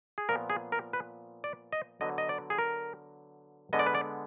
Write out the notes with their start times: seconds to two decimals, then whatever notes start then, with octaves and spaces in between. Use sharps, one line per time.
0.18 G#4
0.29 A#2 F3 B3 A#4
0.50 G#4
0.72 A#4
0.93 B4
1.44 D5
1.73 D#5
2.01 D3 F#3 B3 D#5
2.18 D#5
2.29 D5
2.50 G#4
2.59 A#4
3.73 D3 G#3 B3 D#5
3.79 D5
3.86 B4
3.95 D5